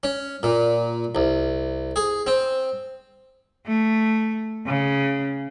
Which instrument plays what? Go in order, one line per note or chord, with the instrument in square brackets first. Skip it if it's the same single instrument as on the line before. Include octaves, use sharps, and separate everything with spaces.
[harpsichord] C#4
A#2
C2
G#4
C4
[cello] A3
C#3